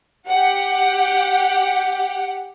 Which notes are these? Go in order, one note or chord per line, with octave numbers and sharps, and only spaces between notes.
G4 F#5